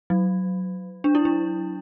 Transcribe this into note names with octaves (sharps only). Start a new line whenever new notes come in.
F#3
D4
E4
D4